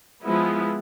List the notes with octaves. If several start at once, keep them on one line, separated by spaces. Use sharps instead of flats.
F3 G#3 B3 E4